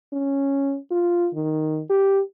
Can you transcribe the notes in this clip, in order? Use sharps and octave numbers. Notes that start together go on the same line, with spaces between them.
C#4
F4
D#3
G4